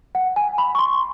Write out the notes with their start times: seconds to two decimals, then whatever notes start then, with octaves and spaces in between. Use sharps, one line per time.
0.15 F#5
0.36 G#5
0.58 B5
0.75 C#6
0.79 C6